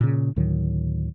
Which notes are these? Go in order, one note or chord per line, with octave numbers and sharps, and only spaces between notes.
A#2 C#3
D2 A2 D#3 F#3